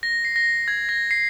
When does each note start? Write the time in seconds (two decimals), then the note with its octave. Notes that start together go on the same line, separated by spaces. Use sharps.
0.03 A#6
0.25 C7
0.36 A#6
0.68 G#6
0.89 A#6
1.11 C7